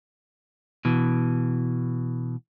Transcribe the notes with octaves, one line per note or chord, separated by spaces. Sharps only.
B2 E3